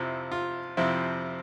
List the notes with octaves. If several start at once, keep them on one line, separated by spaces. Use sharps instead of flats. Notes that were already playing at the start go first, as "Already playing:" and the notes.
Already playing: F2 C3 F3 C4 E4
F4
F2 C3 F3 C4 E4